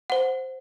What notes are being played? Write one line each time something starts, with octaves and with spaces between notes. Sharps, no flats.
C5 F#5